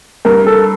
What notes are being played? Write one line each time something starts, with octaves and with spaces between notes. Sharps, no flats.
G2 A#4
A4